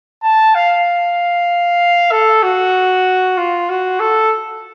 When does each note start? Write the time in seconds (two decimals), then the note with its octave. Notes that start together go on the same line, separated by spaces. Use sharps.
0.23 A5
0.55 F5
2.11 A4
2.43 F#4
3.38 F4
3.69 F#4
4.00 A4